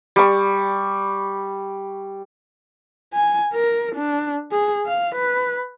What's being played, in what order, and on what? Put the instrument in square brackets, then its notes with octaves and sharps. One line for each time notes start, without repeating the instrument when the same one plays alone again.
[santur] G3 C#6
[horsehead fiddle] G#5
A#4
D4
G#4
F5
B4